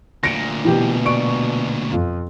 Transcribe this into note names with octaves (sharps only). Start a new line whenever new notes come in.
D2 A#2 A#6 C#7 D7
B2 E3 G4
D5 C#6 D7
F2 F4